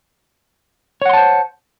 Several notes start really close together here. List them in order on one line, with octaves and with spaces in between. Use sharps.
C#5 F#5 C6 A5 C5